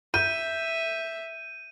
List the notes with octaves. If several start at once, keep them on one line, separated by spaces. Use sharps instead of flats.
E5 G6 D#7